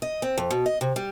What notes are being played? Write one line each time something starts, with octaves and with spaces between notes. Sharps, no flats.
D#5
C4
F2
B2
D#5
C3
G3